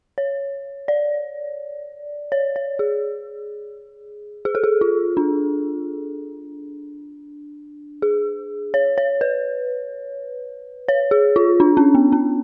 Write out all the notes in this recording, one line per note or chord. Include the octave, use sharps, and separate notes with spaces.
C#5
D5
C#5
C#5
G#4
G#4
A4
G#4
F4
D4
G#4
C#5
C#5
B4
C#5
G#4
F4
D4
C#4
B3
C#4